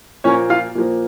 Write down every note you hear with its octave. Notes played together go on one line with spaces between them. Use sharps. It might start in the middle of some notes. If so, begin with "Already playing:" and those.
A#2 F3 A#3 C#4 C#5
F4 F5
A#2 F3 A#3